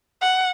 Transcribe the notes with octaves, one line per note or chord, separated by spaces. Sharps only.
F#5